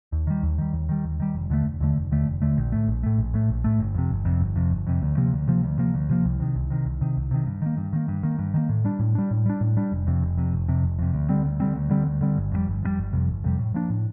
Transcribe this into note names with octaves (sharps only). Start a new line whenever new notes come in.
D#2
D#3 G3
D#2
D#3 G3
D#2
D#3 G3
D#2
D#3 G3
F1
D#2 D3 A3
F1
D#2 D3 A3
F1
D#2 D3 A3
F1
D#2 D3 A3
A#1
A2 A3
A#1
A2 A3
A#1
A2 A3
A#1
A2 A3
G1
F2 C3
G1
F2 C3
G1
F2 C3
G1
F2 C3
D2
C3 F3 A#3
D2
C3 F3 A#3
D2
C3 F3 A#3
D2
C3 F3 A#3
C2
C3 D#3
C2
C3 D#3
C2
C3 D#3
C2
C3 D#3
G2
D#3 A#3
G2
D#3 A#3
G2
D#3 A#3
G2
D#3 A#3
A2
G3 D4
A2
G3 D4
A2
G3 D4
A2
G3 D4
F1
F2 C3
F1
F2 C3
F1
F2 C3
F1
F2 C3
D2
D3 G3 C4
D2
D3 G3 C4
D2
D3 G3 C4
D2
D3 G3 C4
G1
F2 C3 G3
G1
F2 C3 G3
G1
F2 C3 G3
G1
F2 C3 G3
A2
F3 A#3 D4
A2